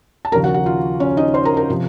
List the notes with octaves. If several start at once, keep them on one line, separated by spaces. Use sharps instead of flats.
A5
D#2 C#3 F3 A#4 A#5
F#4 F#5
F#4 F#5
F4 F5
C#4 C#5
D#4 D#5
C5 C6
A#4 A#5
A#4 A#5
C3 F3